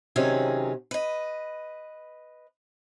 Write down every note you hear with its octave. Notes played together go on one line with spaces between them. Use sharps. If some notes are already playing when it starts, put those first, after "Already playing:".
C3 D#3 F#3 C4 C#4 G#4
B4 D#5